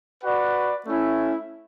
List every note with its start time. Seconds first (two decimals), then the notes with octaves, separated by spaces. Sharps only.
0.23 F#4 B4 D5 F#5
0.86 A3 C#4 E4